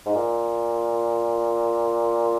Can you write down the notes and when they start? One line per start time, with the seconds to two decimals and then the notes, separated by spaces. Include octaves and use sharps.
0.06 G#2
0.15 A#2